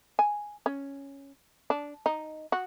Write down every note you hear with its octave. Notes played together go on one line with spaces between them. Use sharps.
G#5
C#4
D4
D#4
F#4